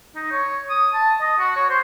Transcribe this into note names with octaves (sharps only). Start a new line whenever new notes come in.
D#4
C#5
D#6
A5
D#5
F#4
C#5
C5